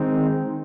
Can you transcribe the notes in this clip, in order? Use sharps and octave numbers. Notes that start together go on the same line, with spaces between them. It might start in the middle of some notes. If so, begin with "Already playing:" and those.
Already playing: D#3 G#3 C4 D#4